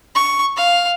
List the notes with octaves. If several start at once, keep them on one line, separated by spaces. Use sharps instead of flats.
C#6
F5